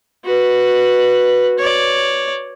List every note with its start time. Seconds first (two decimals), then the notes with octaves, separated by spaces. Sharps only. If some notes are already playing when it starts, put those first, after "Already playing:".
0.25 F#4 B4
1.59 C#5 D5